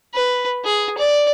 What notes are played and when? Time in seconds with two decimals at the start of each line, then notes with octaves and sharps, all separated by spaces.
0.14 B4
0.64 G#4
0.97 D5